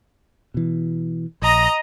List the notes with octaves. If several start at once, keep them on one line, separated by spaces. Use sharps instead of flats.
B2 E3
A#1 D#5 A#5 D#6